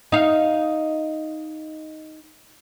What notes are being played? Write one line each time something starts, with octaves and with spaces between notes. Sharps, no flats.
D#4 F5